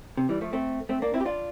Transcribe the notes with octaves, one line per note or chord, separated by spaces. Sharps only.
C3
E3 G3
F3 A3
A3 C4
A3 C4
A#3 D4
C4 E4
G4
D4 F4